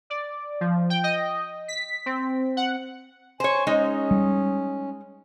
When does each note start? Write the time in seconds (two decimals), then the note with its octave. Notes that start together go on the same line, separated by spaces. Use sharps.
0.10 D5
0.61 F3
0.90 G5
1.04 D#5
1.68 B6
2.06 C4
2.57 F#5
3.40 C5 C#5 G#5
3.67 G#3 C#4 D#4
4.11 G3